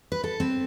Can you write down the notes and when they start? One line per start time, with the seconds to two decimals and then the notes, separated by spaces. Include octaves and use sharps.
0.12 B4
0.24 A4
0.40 C4